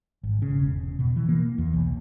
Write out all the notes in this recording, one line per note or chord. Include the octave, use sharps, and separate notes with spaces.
G#1
C#3
E1
B2
E3
A#3
E2
B1